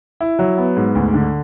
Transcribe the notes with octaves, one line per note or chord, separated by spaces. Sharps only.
E4
F#3
B3
G#2
D2
D3